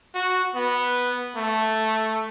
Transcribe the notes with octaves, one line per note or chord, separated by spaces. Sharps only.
F#4
B3
A3